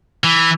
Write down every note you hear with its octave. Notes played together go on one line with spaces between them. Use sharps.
E3